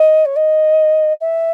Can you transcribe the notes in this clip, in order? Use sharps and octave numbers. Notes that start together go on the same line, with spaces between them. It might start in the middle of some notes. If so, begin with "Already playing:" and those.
Already playing: D#5
C#5
D#5
E5